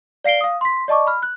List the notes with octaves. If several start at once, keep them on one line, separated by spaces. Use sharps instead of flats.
D5 F5 C7 D7 G7
F5 D#6
C6 B6
D5 D#5 A5 C#6 D6
B5 F6
F#6